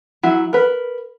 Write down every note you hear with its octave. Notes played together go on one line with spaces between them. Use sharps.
F#3 E4
A#4 B4